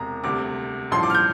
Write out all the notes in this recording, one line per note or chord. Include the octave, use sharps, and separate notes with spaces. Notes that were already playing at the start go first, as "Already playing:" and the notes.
Already playing: E1 C3 A#5
D2 C3 G3 D6
A1 G2 F3 C6
D6
F6
G6